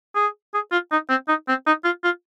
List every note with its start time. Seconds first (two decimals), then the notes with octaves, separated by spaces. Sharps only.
0.15 G#4
0.54 G#4
0.72 F4
0.92 D#4
1.09 C4
1.28 D#4
1.48 C4
1.66 D#4
1.84 F4
2.04 F4